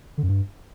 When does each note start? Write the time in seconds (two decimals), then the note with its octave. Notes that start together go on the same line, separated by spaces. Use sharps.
0.18 D3
0.23 F#2
0.29 G2